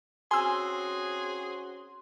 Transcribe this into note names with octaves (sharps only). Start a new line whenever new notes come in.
C4 C#4 F#4 G#4 G#5 C6 E6